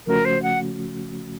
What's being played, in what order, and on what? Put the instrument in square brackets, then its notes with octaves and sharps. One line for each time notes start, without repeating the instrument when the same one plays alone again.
[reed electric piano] C#3 F3 A3 C#4 F#4 [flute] A#4
[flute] C5
F#5